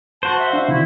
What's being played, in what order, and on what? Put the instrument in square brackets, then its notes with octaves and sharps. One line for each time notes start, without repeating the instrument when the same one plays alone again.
[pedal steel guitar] F#4 C5 [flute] A5
[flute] E5
[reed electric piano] D4 E5 [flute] F5
[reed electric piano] C3 D#3 [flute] E4